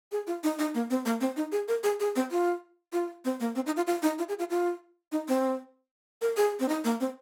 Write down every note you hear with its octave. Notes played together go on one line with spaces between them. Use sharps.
G#4
F4
D#4
D#4
A#3
C4
A#3
C4
D#4
G#4
A#4
G#4
G#4
C4
F4
F4
C4
A#3
C4
D#4
F4
F4
D#4
F4
G#4
F4
F4
D#4
C4
A#4
G#4
C4
D#4
A#3
C4